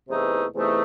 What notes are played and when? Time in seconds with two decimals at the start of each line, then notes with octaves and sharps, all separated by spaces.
0.08 E2 C3 E3 A3 D#4
0.53 E2 C3 E3 A3 D#4